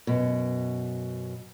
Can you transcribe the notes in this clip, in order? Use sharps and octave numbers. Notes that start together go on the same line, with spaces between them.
F#2 B2